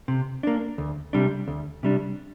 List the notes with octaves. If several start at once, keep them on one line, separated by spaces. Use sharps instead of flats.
C3
A#3 D4
D2
C3 G3 D4
D2
C3 G3 D4